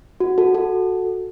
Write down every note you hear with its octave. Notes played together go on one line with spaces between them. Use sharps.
F#4
F#4 A4
F#4 A4